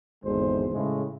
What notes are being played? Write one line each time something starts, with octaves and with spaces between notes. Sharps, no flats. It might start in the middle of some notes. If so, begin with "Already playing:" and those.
G#1 E2 D3 G#3 C5
A2 C#3 G#3